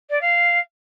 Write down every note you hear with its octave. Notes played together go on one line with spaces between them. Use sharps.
D5
F5